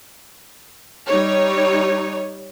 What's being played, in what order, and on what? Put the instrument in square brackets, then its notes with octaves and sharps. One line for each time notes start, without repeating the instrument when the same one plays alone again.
[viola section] G3 D#4 C#5